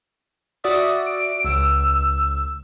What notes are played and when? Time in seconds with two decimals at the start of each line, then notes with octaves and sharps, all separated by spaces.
0.64 F#4 D5 E5 D#6
1.06 D7
1.45 C#2 E6